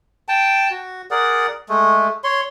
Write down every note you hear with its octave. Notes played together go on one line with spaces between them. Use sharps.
G5 A5
F#4
G#4 A#4 D5 F#5
G#3 A3
C#5 C6